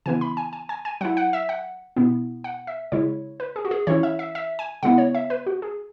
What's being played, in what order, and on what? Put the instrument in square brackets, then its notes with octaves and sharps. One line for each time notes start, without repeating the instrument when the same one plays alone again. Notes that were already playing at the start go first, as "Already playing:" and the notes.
[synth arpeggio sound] C#3 E3 B3 E4 G#5
B5
G#5
G#5
G#5
G#5
F#3 E4 F#5
F#5
E5
F#5
B2 B3 E4
F#5
E5
C#3 G#3 E4 C#5
B4
G#4
F#4
G#4
E3 C#4 E4 C#5
E5
E5
E5
G#5
C#3 G#3 B3 E4 F#5
C#5
E5
B4
F#4
G#4